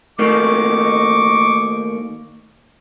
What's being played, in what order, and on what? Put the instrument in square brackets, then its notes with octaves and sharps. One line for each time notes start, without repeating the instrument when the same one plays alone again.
[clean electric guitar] D#3 A3 A#3 [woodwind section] D#5 C#6 D6